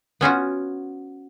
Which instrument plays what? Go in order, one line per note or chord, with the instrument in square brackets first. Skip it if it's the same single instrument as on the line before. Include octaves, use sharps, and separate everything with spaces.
[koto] B3 C#4 F4 F#4